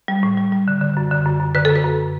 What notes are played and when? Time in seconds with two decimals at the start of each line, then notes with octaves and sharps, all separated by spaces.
0.08 G3
0.23 A2
0.38 G3
0.52 G3
0.68 D3
0.81 D3
0.97 F#2
1.11 D3
1.26 F#2
1.40 F#2
1.55 D3 B4
1.65 F#2 A4
1.75 B4
1.84 F#2